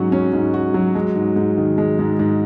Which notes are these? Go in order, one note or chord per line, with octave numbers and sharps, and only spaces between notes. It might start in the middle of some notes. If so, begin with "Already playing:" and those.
Already playing: G#2 F#3 C#4 F#4
C#4
G#2
F#4
F#3
G#3
G#2
G#2
D#3
G#3
G#2
G#2